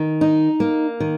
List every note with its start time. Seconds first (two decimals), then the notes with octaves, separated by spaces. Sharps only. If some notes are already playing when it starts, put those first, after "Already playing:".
Already playing: D#3
0.21 D#4
0.60 A#3
1.00 D#3